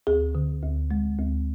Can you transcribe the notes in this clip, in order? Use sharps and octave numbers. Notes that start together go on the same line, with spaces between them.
D2 G#4
D3
D2
G#3
D2